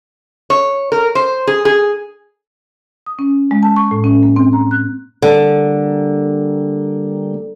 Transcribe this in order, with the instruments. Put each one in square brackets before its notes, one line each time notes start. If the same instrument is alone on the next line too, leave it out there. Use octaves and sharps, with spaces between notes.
[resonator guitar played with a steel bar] C#5
A#4
C5
G#4
G#4
[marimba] D#6
C#4
G#3
A5
C#6
A2
C#4
A#3
C4
A#5
F#6
[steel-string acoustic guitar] D3 [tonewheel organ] G3 A#3